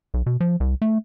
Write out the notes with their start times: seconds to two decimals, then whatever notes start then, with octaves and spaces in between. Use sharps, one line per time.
0.14 B1
0.26 B2
0.40 F3
0.60 C2
0.82 A3